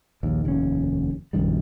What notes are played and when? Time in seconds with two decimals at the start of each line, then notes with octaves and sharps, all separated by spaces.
0.23 A#1 D#2
0.45 F1 D#2 C#4
1.33 A#1 F#2 D#3 G3